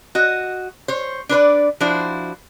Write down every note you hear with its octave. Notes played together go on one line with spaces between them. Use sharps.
F#4 D#5
C5 C#5
D4 B4 C5 D5
F3 D4 E4 F#4 C5